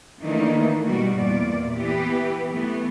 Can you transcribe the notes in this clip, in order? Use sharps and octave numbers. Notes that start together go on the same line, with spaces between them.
D#3 E3 A3 A#3 D4 D#4
B2 G3 F#4
E2 A#2 D5
E3 B3 G4 B4
E3 A3 B3